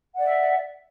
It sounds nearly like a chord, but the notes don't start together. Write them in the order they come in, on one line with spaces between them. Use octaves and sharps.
F#5 D5 E5